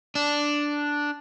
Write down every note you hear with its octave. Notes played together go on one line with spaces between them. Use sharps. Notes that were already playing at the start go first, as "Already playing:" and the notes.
D4